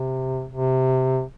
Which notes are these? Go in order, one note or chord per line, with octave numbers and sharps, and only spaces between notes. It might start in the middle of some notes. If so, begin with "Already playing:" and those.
Already playing: C3
C3